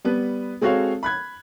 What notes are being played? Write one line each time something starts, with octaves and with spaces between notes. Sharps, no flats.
G3 B3 B4
G#3 C4 F#4 A4 C#5 F5
B5 F#6 G#6